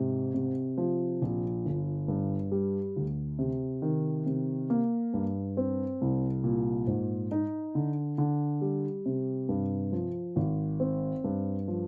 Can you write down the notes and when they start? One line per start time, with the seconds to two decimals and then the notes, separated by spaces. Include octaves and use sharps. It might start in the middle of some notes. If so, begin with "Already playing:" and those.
Already playing: G#2 C3
0.34 C3
0.78 F3
1.22 A#1
1.65 G1
2.08 G2
2.52 G3
2.96 D2
3.39 C3
3.82 D#3
4.26 C3
4.70 A#3
5.14 G2
5.57 C4
6.01 C2
6.44 A#2
6.87 G#2
7.32 D#4
7.75 D3
8.18 D3
8.62 G3
9.06 C3
9.49 G2
9.92 F3
10.36 G#1
10.80 C4
11.24 G2
11.68 F3